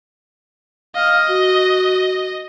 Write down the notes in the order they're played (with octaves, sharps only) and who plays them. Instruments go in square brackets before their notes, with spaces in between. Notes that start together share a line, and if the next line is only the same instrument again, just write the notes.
[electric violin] D#5 [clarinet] F5
[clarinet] F#4